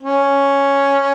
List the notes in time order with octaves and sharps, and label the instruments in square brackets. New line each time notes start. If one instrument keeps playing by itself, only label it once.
[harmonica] C#4